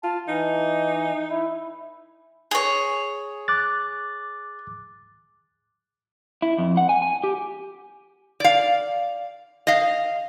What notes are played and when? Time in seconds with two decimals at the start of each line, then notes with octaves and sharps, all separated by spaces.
0.04 F4 A5
0.28 E3 D#4
1.30 E4
2.51 G#4 C#5
3.48 D6 F#6 A6
6.42 E4
6.58 F2
6.77 F#5
6.89 G#5
7.02 G#5
7.24 G4
8.40 D5 F5
9.67 D#5 F5